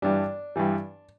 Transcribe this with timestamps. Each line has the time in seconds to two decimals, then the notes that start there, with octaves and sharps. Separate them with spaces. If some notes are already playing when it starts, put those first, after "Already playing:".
0.02 G2 E3 G3 D4
0.56 G2 E3 G3